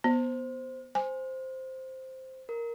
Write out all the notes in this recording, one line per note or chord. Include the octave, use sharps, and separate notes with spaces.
B3 C5
C5 G#5
A#4